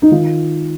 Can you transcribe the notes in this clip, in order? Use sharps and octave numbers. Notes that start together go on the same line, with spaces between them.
D#4
D#3 F4